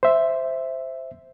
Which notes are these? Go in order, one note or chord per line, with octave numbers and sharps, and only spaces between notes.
C5 E5